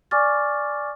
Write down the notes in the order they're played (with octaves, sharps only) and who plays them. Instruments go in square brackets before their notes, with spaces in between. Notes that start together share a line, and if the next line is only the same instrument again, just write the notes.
[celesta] D5 G#5 C#6 D6 F6 A6